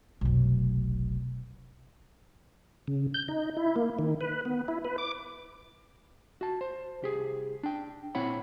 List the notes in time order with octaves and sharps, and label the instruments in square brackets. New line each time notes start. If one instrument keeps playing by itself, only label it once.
[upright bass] F1 B1
[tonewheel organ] C#3
G6
D#4
E4
A#3
D#3
B4
B3
E4
B4
D6
[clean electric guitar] F#4 A5
C5
C2 G4 G#4
D4 G5
A#2 C4 E4 C#5 F#5 B5